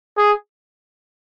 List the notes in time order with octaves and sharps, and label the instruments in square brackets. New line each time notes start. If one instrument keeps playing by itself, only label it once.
[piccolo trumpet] G#4